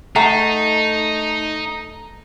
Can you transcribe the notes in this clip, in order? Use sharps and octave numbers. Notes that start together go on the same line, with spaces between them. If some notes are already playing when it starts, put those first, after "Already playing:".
A3 D#4 F#5 A5 A#5